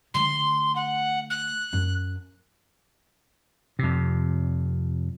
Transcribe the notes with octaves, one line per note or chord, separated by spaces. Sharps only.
D3 A3 C6
F#5
F#6
F#2
F2 C3